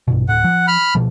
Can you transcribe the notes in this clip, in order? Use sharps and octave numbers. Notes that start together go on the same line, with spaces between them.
A#1 G2 B2
D1 A2 F#5
F3
B5 F6
B2 F3